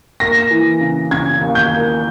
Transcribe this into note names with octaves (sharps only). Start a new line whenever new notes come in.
A#3 A#6
E3
C#3
C#3 G#6
D#2
G6
A#3